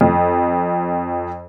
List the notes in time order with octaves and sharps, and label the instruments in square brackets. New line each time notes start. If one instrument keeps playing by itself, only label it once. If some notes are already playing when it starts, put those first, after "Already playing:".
[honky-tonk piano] F2